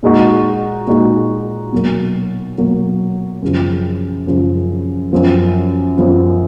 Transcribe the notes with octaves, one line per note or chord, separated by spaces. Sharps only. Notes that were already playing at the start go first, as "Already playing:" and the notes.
A#2 G#3 D#4 F#4
A#2 G#3 D#4 F#4
B2 F#3 A#3
B2 F#3 A#3
F#2 C#3 F3
F#2 C#3 F3
F#2 F3 B3
F#2 F3 B3